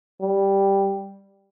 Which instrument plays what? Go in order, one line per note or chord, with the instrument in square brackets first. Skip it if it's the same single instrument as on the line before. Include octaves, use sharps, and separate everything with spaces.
[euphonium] G3